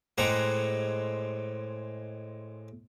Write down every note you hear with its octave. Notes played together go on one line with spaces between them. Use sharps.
A2 G#3 C4 F#5 A#5 D6